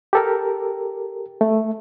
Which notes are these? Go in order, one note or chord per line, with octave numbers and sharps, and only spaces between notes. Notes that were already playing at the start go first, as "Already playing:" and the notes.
G4 A4 A#4
A3